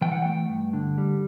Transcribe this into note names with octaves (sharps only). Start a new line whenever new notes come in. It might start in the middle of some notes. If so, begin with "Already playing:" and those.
E3 G5
F#5
A3 G5
G2
D3
G3